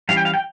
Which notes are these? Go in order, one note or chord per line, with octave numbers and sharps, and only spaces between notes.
E3 G3 C#4 F5
G5
F5
G5